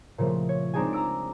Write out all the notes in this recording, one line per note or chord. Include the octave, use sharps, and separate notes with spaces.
A#2 C#3 F3 A3
C#5
G#3 C4 D4 D#4 G#4 G#5
A#5 D6 E6 D7